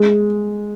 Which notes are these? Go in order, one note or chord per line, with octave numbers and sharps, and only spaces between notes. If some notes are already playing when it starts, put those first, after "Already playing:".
Already playing: G#3